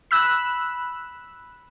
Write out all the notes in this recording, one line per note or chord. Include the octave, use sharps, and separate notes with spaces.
B5 E6 F#6